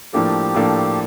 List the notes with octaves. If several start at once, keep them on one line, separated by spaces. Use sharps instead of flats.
A2 F3 A#3 D4 G4 A4
A2 F3 A#3 D4 A4